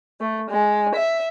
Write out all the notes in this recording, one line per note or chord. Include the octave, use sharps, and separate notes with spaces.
A3
G#3
E5